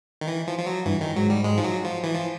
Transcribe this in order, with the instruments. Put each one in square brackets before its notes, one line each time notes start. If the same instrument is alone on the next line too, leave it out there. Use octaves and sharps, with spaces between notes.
[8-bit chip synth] D#3
E3
F3
F3
F#3
[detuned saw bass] G2 [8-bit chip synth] E3
[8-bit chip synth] D#3
[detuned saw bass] G#2 [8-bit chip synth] F#3
[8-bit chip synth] G3
G#3
F3
F#3
F3
E3
F3